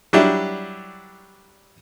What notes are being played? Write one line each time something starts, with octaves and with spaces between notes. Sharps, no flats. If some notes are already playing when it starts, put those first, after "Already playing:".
F#3 G3 D4 E4 G4